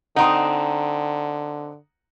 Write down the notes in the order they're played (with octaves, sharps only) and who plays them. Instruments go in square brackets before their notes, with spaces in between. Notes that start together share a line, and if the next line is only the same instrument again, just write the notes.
[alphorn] D3 [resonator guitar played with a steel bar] C4 D#4 [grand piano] F#5 A#5 D#6